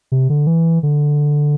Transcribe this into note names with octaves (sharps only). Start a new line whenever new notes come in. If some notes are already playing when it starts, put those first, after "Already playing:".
C3
D3
E3
D3